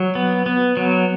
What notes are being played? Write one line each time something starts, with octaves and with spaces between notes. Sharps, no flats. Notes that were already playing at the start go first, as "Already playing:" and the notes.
Already playing: F#3
B3
B3
F#3